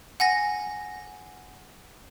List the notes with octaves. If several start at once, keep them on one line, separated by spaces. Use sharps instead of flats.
F#5 G#5 A#6